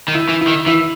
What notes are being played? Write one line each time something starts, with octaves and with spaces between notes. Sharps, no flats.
D#3
E4
E3
E4
D#3
E3 E4